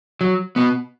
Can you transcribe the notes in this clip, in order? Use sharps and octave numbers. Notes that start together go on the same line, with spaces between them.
F#3
B3 F#4